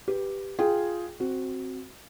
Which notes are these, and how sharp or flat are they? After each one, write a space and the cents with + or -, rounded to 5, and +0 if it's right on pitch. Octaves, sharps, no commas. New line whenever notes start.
G4 +0 B4 +0
F4 +0 G#4 +0 G5 +0
C4 +5 F#4 +0